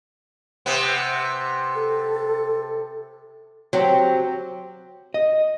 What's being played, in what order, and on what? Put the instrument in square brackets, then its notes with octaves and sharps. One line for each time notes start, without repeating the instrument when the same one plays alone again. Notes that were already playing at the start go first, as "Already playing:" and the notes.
[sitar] C3 B3
[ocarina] A4
[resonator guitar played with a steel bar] F#3 [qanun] C4 G4
[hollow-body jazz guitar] D#5